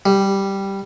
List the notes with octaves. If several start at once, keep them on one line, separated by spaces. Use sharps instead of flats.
G3